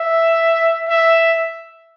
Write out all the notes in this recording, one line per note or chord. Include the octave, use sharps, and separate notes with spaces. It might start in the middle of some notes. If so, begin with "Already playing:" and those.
Already playing: E5
E5